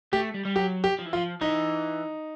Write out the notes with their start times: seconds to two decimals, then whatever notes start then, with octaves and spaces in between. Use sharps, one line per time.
0.13 A3 G4
0.34 G3
0.45 G3
0.56 F#3 G4
0.84 G4
0.99 F3
1.06 E3
1.13 F3 F4
1.41 E3 D#4